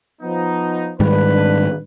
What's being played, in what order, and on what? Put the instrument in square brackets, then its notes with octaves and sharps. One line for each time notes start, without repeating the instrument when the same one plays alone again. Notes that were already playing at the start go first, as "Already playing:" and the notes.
[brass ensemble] F3 B3 D#4
[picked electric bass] G#2 D#3 G3 [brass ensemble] D4 B4